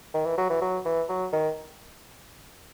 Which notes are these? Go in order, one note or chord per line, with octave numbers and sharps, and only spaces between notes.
D#3
E3
F#3
E3
F#3
E3
F#3
D#3